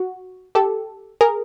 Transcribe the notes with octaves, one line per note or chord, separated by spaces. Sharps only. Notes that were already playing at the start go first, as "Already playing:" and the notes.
Already playing: F#4
G4 A4
G#4 A#4